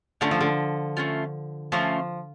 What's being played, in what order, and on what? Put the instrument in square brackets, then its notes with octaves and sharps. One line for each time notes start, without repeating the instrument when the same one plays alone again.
[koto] D3 [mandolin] A3 C#4 F4
[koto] F3
D3
[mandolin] A3 C#4 F4
[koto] F3 [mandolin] A3 C#4 F4